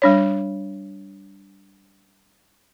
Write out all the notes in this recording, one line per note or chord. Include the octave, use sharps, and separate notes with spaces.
G3 D4 C#5